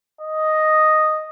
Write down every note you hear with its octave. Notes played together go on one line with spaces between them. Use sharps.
D#5